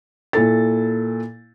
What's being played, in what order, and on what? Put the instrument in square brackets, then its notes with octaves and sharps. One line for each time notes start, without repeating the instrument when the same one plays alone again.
[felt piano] A#2 E4 A4 A6